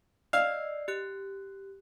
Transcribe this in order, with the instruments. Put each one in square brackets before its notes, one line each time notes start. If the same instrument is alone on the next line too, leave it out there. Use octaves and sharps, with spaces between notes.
[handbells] D5 D#5 E6 [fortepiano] F5
[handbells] G4 F#6